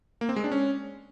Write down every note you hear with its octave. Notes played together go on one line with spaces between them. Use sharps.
A#3
C4
G#3
D4
C#4